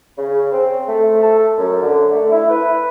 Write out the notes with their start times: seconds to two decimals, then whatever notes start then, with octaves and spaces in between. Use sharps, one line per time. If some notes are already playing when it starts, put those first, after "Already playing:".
0.18 C#3
0.52 C4
0.87 A3
1.22 A4
1.58 F#2
1.82 D3
2.12 A3
2.31 E4
2.50 B4